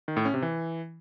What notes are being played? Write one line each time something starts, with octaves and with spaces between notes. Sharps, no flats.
D#3
A2
C#4
C3
E3